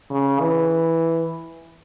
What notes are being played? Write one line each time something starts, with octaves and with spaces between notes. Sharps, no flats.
C#3
E3